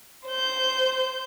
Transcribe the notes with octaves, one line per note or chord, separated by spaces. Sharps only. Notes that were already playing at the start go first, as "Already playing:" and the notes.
C5 G6